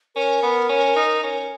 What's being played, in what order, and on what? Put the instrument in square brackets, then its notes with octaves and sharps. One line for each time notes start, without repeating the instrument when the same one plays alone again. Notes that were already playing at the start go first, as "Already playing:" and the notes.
[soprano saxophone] C#4 [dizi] A#4
[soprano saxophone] B3
C#4
D#4
C#4